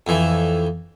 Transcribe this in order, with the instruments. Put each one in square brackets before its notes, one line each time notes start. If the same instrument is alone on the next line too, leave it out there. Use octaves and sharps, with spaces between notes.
[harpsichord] F2 E3